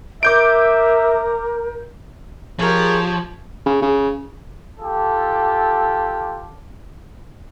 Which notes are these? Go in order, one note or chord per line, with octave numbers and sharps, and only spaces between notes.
A#4 E5 D6 G6 D7
F3 G4 G#4 A#4 C#5
C#3
C#3
F4 G4 A4